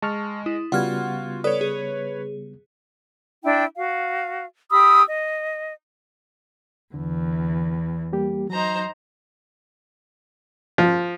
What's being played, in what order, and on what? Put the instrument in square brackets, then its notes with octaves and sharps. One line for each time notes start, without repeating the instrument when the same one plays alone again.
[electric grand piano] G#3 [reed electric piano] A5 C#6 F6
[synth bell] E4 [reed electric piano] D#6
[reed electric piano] C#3 G3 B3 [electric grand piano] F4 F#4 [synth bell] F#5 F6 G#6
[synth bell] A4 D5 D#6 [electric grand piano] B4 C#5
[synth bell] G#4
[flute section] D4 E4 G5
F#4 F5
G4 B5 D#6 E6
D#5
[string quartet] E2 [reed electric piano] D3
[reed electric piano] G3 A#3 G4
[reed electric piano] F#3 [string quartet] D#4 C5 A#5
[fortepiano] F3